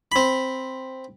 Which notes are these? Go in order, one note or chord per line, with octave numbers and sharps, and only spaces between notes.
C4 B5